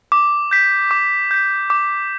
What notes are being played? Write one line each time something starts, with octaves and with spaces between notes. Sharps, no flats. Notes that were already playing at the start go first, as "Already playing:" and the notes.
D6
G6 B6
D6
G6 B6
D6